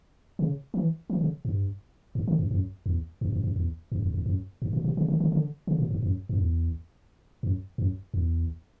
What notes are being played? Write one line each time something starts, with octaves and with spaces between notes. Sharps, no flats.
C#3
E3
E3
C#3
G2
G2
D3
F#2
F#2
E2
F#2
F#2
F#2
E2
F#2
E2
E2
F#2
G2
A#2
B2
C#3
D3
D3
D3
C#3
A#2
G2
F#2
F#2
E2
F#2
F#2
E2